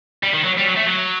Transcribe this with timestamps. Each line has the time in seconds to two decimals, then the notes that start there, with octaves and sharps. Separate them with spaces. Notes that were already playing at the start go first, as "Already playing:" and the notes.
0.23 G3
0.34 D#3
0.44 F#3
0.58 G3
0.65 F#3
0.77 A3
0.87 F#3